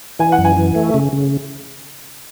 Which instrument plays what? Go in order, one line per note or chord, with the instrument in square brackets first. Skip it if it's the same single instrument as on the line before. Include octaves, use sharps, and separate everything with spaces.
[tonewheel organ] E3 [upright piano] G#5
[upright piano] F#5
[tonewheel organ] F#2
[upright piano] G#5
[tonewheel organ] E3
A3
C#3
C#3